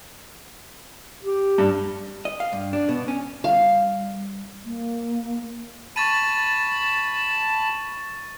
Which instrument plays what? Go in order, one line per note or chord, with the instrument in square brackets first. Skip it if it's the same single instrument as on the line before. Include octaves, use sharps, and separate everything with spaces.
[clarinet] G4
[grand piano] G2
[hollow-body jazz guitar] D#5
F5
G2
D4
B2
C#4
[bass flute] G3 [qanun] F5
[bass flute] A#3
[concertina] A5 B5 [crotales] C#6 A6 D#7